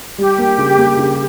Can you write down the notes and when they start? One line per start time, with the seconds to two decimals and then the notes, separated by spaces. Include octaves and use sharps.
0.18 G3 G4
0.38 A#3
0.58 C#3
0.77 A#3
0.98 C#3